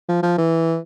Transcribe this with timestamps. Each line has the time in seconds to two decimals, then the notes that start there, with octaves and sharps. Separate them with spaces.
0.09 F3
0.23 F3
0.38 E3